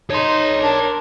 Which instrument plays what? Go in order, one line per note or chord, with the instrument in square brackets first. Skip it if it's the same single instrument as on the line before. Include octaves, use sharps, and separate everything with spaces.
[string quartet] D#4 [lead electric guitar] C#5 C6
[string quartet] D4 A#4